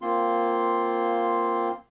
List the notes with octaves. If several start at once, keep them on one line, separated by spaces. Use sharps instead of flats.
A#3 C4 F4 C6